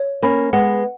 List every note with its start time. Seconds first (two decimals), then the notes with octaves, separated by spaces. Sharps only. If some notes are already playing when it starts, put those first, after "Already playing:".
Already playing: C#5
0.22 A#3 C#4 B5
0.53 G#3 B3 F#5